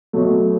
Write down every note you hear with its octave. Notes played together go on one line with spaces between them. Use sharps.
B2 F#3 A3